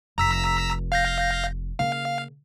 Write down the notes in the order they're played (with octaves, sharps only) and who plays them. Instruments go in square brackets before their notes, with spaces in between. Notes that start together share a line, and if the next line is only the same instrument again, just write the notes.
[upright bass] F1 [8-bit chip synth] A#5 E6 B6
[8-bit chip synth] F5 G6 A#6
[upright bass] C#3 A#3 [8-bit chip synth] F5